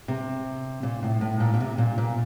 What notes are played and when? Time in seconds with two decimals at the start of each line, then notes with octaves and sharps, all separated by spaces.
0.08 C3
0.83 A#2
1.03 A2
1.21 A2
1.40 A#2
1.54 A#2
1.60 C3
1.78 A#2
1.98 A#2